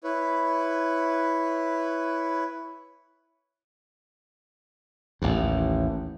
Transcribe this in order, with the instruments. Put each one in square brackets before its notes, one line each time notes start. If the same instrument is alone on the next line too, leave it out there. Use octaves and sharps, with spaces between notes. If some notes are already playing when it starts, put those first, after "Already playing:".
[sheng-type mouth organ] E4 B4 C#5
[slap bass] A1 D#2